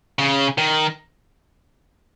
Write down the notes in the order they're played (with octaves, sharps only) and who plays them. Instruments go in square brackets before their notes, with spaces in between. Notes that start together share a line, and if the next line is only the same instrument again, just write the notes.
[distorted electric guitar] C#3
D#3